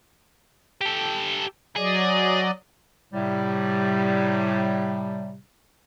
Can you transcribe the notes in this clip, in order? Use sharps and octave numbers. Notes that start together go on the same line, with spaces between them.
G4 A4
F#3 G#4 D5 D#5
A2 C3 G3